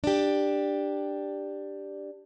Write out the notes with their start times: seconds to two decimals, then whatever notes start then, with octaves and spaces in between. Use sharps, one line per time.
0.04 D4 G4